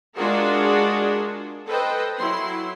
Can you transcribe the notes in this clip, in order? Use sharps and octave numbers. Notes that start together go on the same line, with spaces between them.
G#3 D4 F4 F#4 G#4 A#4
A4 B4 C5 D#5 G5
F#3 E4 C6